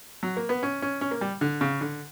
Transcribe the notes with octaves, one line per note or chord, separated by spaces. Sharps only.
F#3
A#3
B3
C#4
C#4
C#4
A#3
G3
D3
C#3
D3